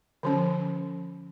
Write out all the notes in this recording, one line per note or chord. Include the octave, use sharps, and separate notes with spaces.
D3 F3 C#4